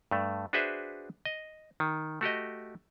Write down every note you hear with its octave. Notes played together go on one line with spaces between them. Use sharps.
G2 A3
D4 F#4 G#4 B4 C5 E5
D#5
D#3
A3 F#4 G4 D#5